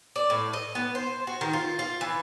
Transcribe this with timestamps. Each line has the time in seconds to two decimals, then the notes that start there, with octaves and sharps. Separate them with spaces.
0.16 D5
0.30 A2
0.53 D#5
0.75 B3
0.95 C5
1.27 F#4
1.41 D#3
1.53 F4
1.79 F4
2.01 E3